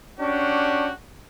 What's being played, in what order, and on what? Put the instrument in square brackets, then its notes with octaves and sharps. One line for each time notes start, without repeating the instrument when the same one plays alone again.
[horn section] C#4 D4 F#4 G4